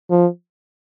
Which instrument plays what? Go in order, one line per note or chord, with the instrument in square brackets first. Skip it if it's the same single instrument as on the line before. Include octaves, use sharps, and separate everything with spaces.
[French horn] F3